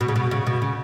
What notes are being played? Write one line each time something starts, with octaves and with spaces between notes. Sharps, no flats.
B2
C#3
B2
C#3
B2
C#3